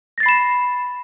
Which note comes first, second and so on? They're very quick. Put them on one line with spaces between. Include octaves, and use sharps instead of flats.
A#6 A6 C7 B5 E7